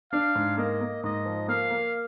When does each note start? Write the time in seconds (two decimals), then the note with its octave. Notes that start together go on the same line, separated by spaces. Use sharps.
0.12 D4 F5
0.35 G#2
0.57 A#3 D#5
0.81 A#3
1.03 G#2 D#5
1.26 F3
1.48 A#3 F5
1.70 A#3